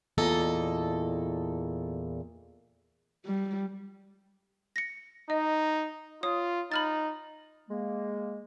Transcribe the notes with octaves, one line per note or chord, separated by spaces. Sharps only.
E2 A#2 A4 D#5
G3
A#6 C#7
D#4 D#5
F4 C#5 D#6
D#4 B5 F6 A6
G#3 A#3